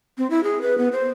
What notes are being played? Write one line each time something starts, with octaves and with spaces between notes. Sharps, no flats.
C4
E4
G#4
B4
B3
C5